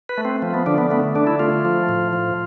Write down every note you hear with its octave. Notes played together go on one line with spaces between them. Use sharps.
B4
A3
C4
F3
B3
D3 D4
B3
A3 B3
D3 D4
E4
A3 F4
F3
A2
F3